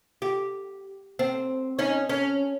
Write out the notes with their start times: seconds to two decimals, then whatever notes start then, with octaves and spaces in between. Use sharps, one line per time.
0.22 G4
1.19 C4
1.79 C#4 D#4
2.09 C#4